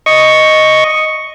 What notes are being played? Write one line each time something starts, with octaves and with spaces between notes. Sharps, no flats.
D#5 C#6